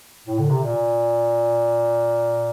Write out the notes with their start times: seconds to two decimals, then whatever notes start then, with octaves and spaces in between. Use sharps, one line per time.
0.27 A2
0.39 D3
0.50 C3
0.63 A#2